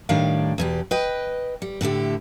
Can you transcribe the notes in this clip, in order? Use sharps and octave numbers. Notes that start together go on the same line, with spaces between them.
A2 D#3 G3 D4 F5
E2 B2 G4
B4 D#5 G5
G3
A2 D3 E4 G4